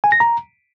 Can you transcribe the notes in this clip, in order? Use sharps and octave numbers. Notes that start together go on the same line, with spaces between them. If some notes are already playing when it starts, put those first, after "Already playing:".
G#5
A#6
A#5